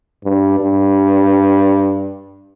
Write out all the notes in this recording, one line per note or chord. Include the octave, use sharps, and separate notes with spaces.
G2
G2